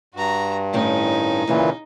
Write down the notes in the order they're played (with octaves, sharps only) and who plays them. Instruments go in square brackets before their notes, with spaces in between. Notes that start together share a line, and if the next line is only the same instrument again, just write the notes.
[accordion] G2 [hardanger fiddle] F#4 A#5
[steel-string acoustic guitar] A2 D#3 C#4 [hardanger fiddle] D#4
[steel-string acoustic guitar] D#2 C#3 A#3 [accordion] A#2 E3